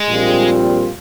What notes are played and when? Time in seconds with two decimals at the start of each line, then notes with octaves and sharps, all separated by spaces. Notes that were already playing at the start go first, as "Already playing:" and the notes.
Already playing: G#3
0.08 A#1 A#2 G3 C4 F4